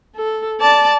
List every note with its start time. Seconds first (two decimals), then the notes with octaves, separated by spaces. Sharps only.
0.16 A4
0.61 D5 A5